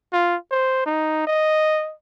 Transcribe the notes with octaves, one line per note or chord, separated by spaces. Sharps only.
F4
C5
D#4
D#5